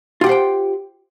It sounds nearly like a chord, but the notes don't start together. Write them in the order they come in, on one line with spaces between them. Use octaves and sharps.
F4 G4 F#5 C5 G5